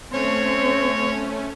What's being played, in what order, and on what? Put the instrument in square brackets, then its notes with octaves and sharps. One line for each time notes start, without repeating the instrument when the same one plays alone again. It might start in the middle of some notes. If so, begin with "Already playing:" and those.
[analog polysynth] A3 C#4 [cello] C4 [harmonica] C#5